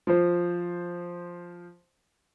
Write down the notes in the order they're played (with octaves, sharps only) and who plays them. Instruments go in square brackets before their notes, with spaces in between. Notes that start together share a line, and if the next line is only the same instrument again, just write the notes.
[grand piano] F3 C5